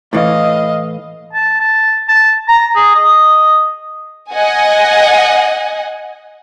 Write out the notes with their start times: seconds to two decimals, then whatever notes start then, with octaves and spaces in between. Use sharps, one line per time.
0.13 A2 E3 D#5 F5
1.33 A5
1.60 A5
2.08 A5
2.48 A#5
2.76 G#4
2.95 D#5
4.32 D#5 F#5 G#5